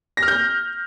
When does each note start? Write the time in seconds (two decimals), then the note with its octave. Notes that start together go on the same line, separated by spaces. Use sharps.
0.17 A#6
0.23 F6
0.28 G6